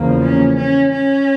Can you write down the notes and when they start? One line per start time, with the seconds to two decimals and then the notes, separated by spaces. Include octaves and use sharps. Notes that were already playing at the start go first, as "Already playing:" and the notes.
Already playing: E2 C#3 F3 A#3
0.22 C#4
0.57 C#4
0.92 C#4